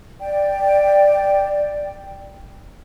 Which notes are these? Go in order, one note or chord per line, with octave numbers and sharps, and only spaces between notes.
D5 G5